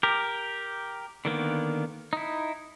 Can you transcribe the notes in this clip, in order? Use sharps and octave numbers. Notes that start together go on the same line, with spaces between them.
G4 A#4
D3 D#3 A#3 B3
D#4 E4